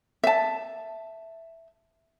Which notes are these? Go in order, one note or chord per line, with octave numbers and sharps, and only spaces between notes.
E5 A5